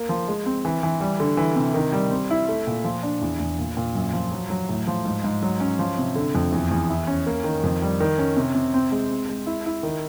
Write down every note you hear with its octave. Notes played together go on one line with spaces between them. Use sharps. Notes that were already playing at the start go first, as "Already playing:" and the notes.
Already playing: A#3
F3
G#3
C4
E3
E3
G3
D3
E3
C3
D#3
G3
C4
E4
A3
A#2
F3
D4
E2
E2
A#2
A#2
F#2
F3
F#3
F#3
A2
F3
G#2
G#2
F#3
C#4
F3
C3
D3
F2
E2
E2
E4
C#4
A#3
D#3
F2
G3
D#3
C#4
C3
C3
C4
G#3
C4
G#3
E4
E4
D#3